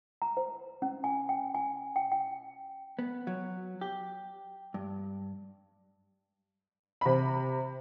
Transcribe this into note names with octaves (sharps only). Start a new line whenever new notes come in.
A#5
C5
C#4
G#5
G5
G#5
G5
G5
B3
F#3
G4
G2
C3 B5